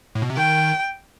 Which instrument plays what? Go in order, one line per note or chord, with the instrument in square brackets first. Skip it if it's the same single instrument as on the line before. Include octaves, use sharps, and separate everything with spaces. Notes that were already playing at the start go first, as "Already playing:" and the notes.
[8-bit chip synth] A2
B2
C3
[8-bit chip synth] D#3 [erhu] G5